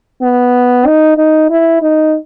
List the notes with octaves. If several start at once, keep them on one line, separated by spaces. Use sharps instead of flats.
B3
D#4
D#4
E4
D#4